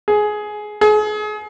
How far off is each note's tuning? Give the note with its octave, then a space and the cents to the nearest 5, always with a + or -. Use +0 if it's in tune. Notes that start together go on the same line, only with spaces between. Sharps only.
G#4 +15
G#4 +35